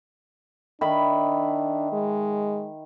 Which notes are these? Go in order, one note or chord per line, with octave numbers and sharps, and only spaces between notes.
D#3 D4 E5 B5
G#3